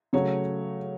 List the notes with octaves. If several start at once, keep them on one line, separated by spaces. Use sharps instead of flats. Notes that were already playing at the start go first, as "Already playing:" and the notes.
C#3 F#3 A3 C#5